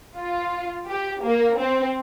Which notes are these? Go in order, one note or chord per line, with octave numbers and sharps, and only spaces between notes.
F4
G4
A#3
C4